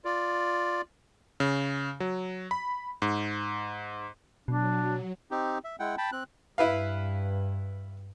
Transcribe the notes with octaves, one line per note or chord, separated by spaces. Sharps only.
F4 D5
C#3
F#3
B5
G#2
B2 F#3 D4
C4 D#4 G4
E5
G#3 E4 F#5 G5
G5 A5 B5
C4 F#6
G2 E4 B4 F5